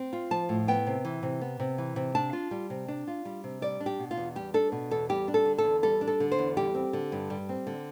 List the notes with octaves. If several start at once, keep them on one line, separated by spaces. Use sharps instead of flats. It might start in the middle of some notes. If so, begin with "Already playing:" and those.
Already playing: C4
F4
F3 A5
A2
B3 G5
C3
E3
C3
B3
C3
E3
C3
D4 A5
F4
G3
C3
D4
F4
G3
C3
G3 D5
D4
G4
B2
F4
E2
G3 G4
D4 A4
B2
E2 A4
G3 G4
D4
A4
D3
A4
E2
G3 A4
D4
A4
D3
C5
E2
G3 G4
C4
D3
G2
G3
C4
D3